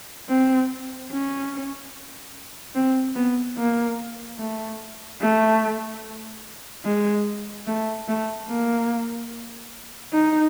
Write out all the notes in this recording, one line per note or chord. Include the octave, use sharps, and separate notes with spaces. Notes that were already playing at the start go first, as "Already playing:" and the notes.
C4
C#4
C4
B3
A#3
A3
A3
G#3
A3
A3
A#3
D#4